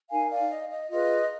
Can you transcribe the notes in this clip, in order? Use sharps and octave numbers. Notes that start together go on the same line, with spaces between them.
D#4 A#4 F5 G#5
D5 F5
D#5
D#5
F4 G#4 B4 D#5